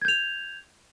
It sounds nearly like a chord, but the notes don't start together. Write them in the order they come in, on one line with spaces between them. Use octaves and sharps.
G#6 G6 F7